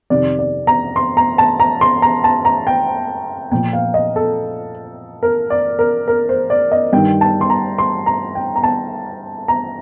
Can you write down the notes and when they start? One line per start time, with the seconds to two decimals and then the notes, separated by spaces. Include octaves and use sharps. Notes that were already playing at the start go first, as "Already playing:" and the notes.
0.10 F2 C3 D#3 D5
0.39 D5
0.67 A#5
0.96 C6
1.17 A#5
1.38 A5
1.60 A#5
1.81 C6
2.02 A#5
2.24 A5
2.45 A#5
2.67 G5
3.52 A#2 F3 G5
3.73 F5
3.94 D#5
4.16 A4
5.23 A#4
5.50 D5
5.79 A#4
6.08 A#4
6.29 C5
6.50 D5
6.72 D#5
6.93 G2 D#3 G5
7.21 A5
7.41 C6
7.50 A#5
7.78 C6
8.06 A#5
8.35 G5
8.56 A#5
8.63 A5
9.48 A#5